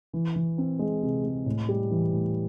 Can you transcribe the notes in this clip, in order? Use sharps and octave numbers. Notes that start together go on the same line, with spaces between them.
E3
E3
C4
G#3
C3
G#3
A2
G3
E3
A2